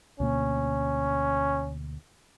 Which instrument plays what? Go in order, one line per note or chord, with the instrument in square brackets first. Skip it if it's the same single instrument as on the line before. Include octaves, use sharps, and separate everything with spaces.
[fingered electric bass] D2 B2 A#3 [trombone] C#4